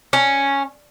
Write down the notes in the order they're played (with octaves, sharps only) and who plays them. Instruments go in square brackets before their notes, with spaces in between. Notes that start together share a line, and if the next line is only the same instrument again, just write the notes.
[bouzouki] C#4